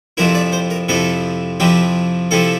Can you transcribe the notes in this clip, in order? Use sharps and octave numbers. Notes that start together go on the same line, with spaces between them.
F2 C3 F3 C4 E4 A#4
D5
C5
A#4
F2 C3 F3 C4 E4 A4
F2 C3 F3 C4 E4 G4
C3 F3 C4 E4 A4